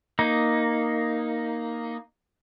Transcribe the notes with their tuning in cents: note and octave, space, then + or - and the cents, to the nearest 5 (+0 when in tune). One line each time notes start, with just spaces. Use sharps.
A#3 +0 D#4 +0